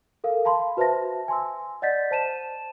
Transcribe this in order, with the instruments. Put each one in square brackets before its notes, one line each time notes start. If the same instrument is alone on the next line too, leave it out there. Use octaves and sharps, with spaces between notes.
[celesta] A4 A#4 F5
F5 A5 B5 C6
F#4 B4 C5 E5 A5 A#6
G#5 C6 E6
D5 D#5 F#5 G6 A6 B6
C5 A5 D#7 E7